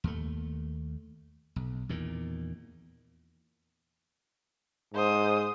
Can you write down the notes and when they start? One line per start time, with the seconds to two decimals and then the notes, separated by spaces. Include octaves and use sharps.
0.04 D#2 A3
1.56 B1
1.89 E2 A#2 D#3
4.94 G#2 C5 D#6